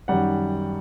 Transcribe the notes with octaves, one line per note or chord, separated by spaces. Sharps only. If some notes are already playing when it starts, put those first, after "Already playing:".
F#2 D#3 G3 F#5